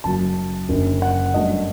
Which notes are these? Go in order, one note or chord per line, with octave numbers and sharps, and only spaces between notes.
F#1 F#2 F#3 A5
F#1 F#2 D3
F#5
G2 F#3 A3 D4 D#5